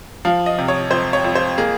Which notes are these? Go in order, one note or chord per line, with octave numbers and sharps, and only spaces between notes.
F3 F5
D#5
C3
C#5
F2 C5
C#5
F2
C5
A#3 G#4